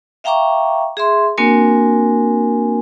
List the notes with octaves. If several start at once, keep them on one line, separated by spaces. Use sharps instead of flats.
E5 F5 G5 A#5 C#6 D6
G#4 E5 C6
A#3 C4 D4 F#4 A#4 G#5